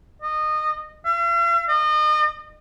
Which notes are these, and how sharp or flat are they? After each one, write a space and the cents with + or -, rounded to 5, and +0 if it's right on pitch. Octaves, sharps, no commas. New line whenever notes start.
D#5 -20
F5 -45
D#5 -35